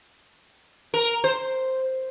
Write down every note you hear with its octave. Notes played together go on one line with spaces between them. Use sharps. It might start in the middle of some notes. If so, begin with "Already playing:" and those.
A#4
C5